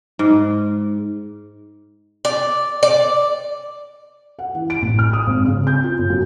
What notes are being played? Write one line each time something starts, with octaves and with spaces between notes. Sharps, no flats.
G#2
D5
D5
F#5
E3
D7
A1
F6
D#6
G#1
C#3
G6
F4
G1
F#2